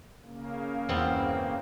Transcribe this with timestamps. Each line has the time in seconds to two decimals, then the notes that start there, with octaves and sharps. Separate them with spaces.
0.23 C#3 A#3
0.89 E2 G2 B3 C4 E4 F4